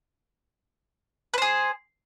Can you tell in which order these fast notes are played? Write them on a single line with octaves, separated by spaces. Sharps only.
B4 C5 G#4